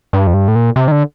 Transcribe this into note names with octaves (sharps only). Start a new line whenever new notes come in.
G2
F2
G2
A2
A#2
C3
D#3
D3